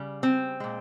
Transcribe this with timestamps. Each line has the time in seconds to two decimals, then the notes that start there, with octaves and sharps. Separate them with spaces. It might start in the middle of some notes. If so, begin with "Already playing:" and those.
Already playing: C#3 G3
0.23 C4
0.60 A#2 G#3